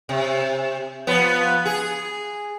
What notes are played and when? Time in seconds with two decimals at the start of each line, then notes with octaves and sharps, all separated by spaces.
0.09 C3
1.07 F3 B3
1.65 G#4